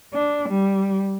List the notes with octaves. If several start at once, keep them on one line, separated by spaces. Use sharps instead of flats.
D4
G3